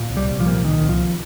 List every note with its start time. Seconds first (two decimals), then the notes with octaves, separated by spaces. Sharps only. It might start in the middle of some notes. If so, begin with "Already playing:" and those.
Already playing: A#2
0.10 C2
0.17 G3
0.29 C2
0.40 F3
0.46 A#2
0.64 A#2 D#3
0.82 C2
0.89 F3